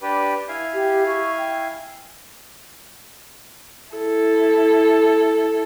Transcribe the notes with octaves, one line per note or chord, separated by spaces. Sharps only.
D4 G4 B4
E4 F5 G#5
G4
C#6
G5
E4 A4